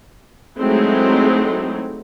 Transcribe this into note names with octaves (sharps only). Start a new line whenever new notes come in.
F#3 G#3 A3 C4 D#4 E4